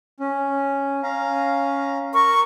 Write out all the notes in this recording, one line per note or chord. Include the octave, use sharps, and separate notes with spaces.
C#4
C#4 F5 A#5
A#4 C#6